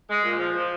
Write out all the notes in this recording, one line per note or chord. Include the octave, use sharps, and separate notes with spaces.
G#3
A#2
F3
F3